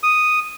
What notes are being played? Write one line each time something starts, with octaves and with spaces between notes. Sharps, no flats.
D#6